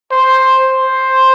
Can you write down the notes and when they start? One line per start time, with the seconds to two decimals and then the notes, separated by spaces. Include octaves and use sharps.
0.11 C5
0.65 C5